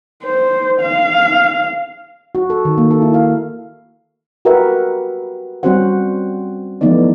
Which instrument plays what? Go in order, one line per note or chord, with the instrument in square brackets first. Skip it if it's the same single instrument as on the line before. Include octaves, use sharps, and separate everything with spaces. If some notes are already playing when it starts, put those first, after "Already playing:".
[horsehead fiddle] C5
F5
[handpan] F#4
A4
D#3
A#3
A4
E4
F5
F#4 G4 A#4 B4 E5 F#5
G3 C4 C#4 F#4 C5 F#5
E3 F3 A3 B3 D#4 D5